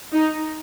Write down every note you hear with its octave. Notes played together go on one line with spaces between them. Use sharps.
D#4